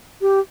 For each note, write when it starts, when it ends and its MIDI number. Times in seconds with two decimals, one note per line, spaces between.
0.22 0.40 67